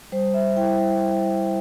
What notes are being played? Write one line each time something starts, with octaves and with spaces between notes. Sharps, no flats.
G3 C5
E5
E4 G5